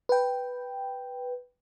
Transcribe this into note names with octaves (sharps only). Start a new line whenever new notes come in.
B4 G5